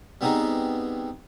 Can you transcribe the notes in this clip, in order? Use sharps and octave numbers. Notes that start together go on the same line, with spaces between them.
G3 B3 C4 D#4 G#4